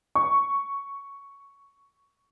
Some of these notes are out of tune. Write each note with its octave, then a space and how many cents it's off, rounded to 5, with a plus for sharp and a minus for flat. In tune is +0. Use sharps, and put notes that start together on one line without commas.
C#6 +5